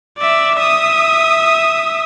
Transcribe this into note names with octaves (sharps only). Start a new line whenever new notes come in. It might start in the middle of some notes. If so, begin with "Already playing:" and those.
D5 E5
E5 D#6